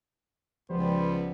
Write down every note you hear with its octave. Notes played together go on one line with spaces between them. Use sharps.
C#2 F3 G3 B3 C5